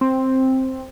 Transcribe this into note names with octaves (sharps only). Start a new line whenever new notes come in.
C4